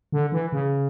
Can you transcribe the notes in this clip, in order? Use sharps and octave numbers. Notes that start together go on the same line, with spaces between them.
D3
E3
C#3